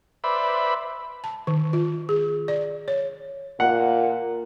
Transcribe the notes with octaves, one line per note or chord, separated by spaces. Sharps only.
B4 C5 D5 E5 B5
A5
D#3
F4
G#4
D5
C#5
A#2 F#5